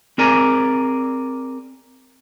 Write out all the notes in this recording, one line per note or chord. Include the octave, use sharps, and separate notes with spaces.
C4 G#4 A#4 D5 G#5 A#5